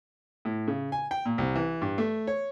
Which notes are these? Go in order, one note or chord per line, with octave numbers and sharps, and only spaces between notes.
A2
C#3
G#5
G5
A#2
C2
E3
G2
A3
C#5